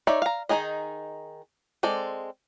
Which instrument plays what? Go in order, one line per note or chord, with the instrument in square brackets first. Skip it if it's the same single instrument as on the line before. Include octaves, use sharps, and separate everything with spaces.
[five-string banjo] D#4 C#5 D5 E5
F5 A#5
D#3 C#4 D#4 G#4 D#5
G#3 C4 A4 D5